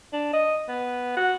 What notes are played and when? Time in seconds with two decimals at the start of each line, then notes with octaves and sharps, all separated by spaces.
0.13 D4
0.33 D#5
0.68 B3
1.17 F#4